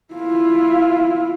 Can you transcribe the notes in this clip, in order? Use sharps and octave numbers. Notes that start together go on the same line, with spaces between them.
E4 F4